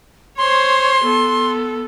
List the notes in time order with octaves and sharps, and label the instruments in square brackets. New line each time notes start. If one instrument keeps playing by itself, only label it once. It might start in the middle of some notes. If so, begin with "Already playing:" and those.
[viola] C5 C#5 [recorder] C6
[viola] B3 A4